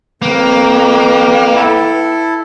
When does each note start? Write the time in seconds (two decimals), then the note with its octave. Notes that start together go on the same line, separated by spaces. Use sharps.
0.22 F2 A#3 B4 G5
1.55 E4 A4